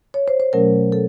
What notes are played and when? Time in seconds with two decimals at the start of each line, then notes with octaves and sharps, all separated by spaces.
0.14 C#5
0.28 C5
0.40 C5
0.53 B2 F#3 A3 C#4 A#4
0.92 A4